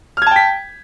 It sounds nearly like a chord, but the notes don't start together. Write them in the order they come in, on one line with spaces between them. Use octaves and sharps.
F6 G#6 A5 G5 B6